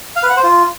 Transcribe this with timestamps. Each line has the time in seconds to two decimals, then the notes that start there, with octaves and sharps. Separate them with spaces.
0.16 F5
0.23 B4
0.30 F#5
0.37 C5
0.44 F4